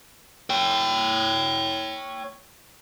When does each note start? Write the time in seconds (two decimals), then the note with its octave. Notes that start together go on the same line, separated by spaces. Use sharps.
0.50 C#5 G5